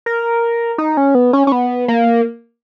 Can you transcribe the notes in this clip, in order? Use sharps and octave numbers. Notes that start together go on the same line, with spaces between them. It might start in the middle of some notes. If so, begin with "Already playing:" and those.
A#4
D#4
C#4
B3
C#4
C#4
B3
A#3